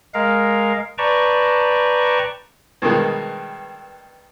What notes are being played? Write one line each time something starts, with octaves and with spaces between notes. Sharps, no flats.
G#3 A#4 F5
B4 D5 G5 A5 A#5 C#6
G2 B2 D#3 G#3